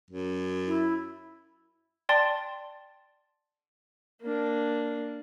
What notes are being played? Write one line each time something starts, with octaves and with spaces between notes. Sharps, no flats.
F#2
E4
D5 G5 A5 C6 A6
A#3 D4